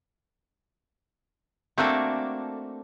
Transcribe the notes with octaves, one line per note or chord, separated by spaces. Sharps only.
A3 A#3 C4 D4 F#4 A4